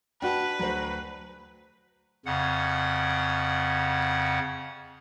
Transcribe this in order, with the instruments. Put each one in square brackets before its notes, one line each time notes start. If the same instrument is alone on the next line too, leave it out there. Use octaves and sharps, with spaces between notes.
[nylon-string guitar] D4 F#4 [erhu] B4 [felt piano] G5 A5
[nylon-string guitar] D2 [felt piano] F#3 F#4 C5
[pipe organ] F2 C#3 F#5